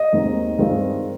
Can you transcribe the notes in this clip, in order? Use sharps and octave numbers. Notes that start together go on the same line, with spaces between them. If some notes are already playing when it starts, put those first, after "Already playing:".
Already playing: D#5
D#2 D#3 G#3 C4 D#4
G2 D#3 G#3 C4 F4